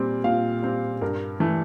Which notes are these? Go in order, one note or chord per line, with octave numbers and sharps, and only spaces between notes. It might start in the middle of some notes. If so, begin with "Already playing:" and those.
Already playing: A#2 G3 C4
A#2 F5
G3 C4
G2 A#4
E3 A3